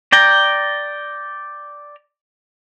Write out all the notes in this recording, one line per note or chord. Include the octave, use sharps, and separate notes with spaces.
D5 G5 A#5